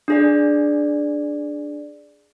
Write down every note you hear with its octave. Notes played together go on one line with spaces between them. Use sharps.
D4 G#4 D5